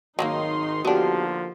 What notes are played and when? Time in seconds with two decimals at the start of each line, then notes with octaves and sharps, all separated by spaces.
0.19 G#1 D#3 F#3 G3 A#3 D#4 C6
0.85 D3 F3 A#3 B3 D4 F#4 G4